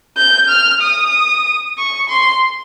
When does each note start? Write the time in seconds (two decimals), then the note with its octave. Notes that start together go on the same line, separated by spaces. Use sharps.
0.17 G6
0.49 F6
0.81 D#6
1.78 C#6
2.09 C6